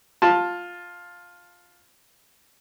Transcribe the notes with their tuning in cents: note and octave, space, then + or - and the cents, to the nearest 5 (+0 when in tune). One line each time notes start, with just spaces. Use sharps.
F4 +10 A5 +0